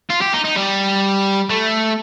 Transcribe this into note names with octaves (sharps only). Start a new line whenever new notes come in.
F4
G4
D#4
D#4
G3
A3